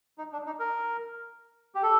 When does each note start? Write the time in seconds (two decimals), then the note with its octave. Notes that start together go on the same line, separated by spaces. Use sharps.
0.18 D#4
0.33 D4
0.46 D#4
0.60 A#4
1.75 G4
1.83 A4